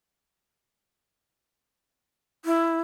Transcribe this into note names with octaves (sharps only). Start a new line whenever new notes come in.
E4